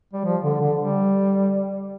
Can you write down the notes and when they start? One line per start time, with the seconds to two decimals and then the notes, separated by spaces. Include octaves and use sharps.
0.13 G3
0.25 F3
0.43 D3
0.61 D3
0.79 G3